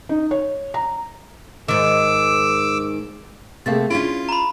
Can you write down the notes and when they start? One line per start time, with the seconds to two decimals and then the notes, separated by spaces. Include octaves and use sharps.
0.09 D#4
0.31 C#5
0.74 A#5
1.68 G#2 D#3 D6 E6
3.66 C3 A3 A#3 G#4 F5 A6
3.91 C#4 D4 E4 F4
4.29 A#5 B5